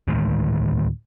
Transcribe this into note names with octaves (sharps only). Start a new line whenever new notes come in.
D2 A2 D#3 G#3